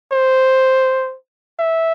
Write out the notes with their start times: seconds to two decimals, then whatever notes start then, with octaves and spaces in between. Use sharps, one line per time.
0.12 C5
1.59 E5